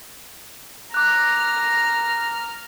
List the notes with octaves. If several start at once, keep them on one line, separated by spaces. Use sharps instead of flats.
A#5 D6 F6 F#6